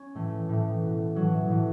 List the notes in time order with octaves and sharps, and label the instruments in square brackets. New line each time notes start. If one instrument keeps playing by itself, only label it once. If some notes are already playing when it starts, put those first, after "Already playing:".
Already playing: [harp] C#4
A2 E3 A3
A2 E3
B2
A2 E3 F#3
A2 E3